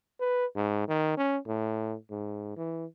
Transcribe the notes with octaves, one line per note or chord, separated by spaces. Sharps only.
B4
G#2
D#3
C#4
A2
G#2
E3